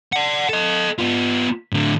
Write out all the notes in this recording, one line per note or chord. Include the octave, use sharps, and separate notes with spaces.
D5 F#5
A4 D#5
B3 F4
A2 D3